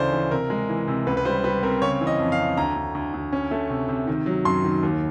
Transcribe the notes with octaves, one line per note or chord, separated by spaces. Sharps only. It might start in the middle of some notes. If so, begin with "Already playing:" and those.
Already playing: D2 C#3 E3 A3 C5 D5
E3
C3 A#4
G#3
E3
C3
C#2 B4
B4
G3 C5
G3 B4
C4 A#4
C#3 C#5
E3
D#5
F2
F5
F2
D2 A#5
D2
D2
D2
C#4
A3
C3
C3
D#3
F#3
F#2 C6
D#3
D#2